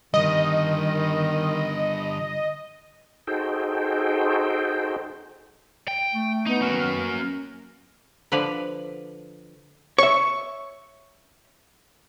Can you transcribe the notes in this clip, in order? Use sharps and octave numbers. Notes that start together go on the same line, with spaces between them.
D3 D#3 G3 D#5
D#4 F#4 G#4 A4 C5 G5
G5
A3
B3 D#4
D#3 A#3 C#4 F#4 F6
A#3 A#4
D3 F3 B4 D5 F5
C#5 E5 C#6